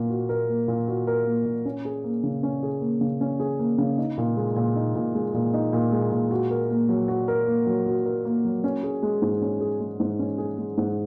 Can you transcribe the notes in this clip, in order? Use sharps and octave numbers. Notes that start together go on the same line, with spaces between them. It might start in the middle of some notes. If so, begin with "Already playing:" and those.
Already playing: A#2 A#3 A#4
F#4
A#4
A#3
A#2
F#4
A#4
A#3
A#2
C#4
G#4
A#3
C#3
C#4
G#4
A#3
C#3
C#4
G#4
A#3
C#3
D#4
A#2
G#3
A#2
D#4
A#2
G#3
A#2
D#4
A#2
G#3
A#2
F#4
A#4
A#3
F#3
F#4
A#4
A#3
F#3
F#4
A#4
A#3
F#3
C#4
G#4
G#3
G#2
C#4
G#4
G#3
G#2
C#4
G#4
G#3
G#2